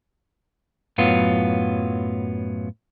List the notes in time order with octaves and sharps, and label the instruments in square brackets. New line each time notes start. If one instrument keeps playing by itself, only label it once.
[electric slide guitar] F#2 A2 F#3 B3 F4